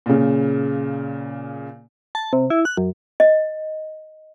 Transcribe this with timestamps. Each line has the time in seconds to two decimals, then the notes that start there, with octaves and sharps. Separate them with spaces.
0.06 A#2 C#3
2.15 A5
2.33 C3
2.50 E4
2.65 F#6
2.77 F#2
3.20 D#5